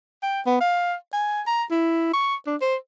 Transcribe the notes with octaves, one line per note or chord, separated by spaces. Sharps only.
G5
B3
F5
G#5
A#5
E4
C#6
D4
C5